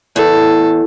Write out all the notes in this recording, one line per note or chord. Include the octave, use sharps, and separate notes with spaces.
E2 A4